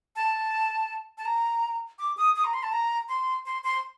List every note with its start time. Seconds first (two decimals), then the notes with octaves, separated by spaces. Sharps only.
0.16 A5
1.18 A5
1.25 A#5
1.99 D6
2.17 D#6
2.36 D#6
2.44 A#5
2.54 C6
2.63 A5
2.73 A#5
3.09 C6
3.46 C6
3.64 C6